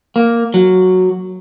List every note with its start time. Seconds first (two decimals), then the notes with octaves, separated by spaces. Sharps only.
0.16 A#3
0.54 F#3